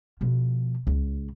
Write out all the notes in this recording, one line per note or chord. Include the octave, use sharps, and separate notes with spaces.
B2 F3
C#2